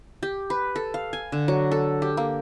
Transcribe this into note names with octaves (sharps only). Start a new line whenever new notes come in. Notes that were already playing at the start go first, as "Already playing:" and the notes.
G4
B4
A4
F5
G#5
D3
F#3
A4
G4
A#3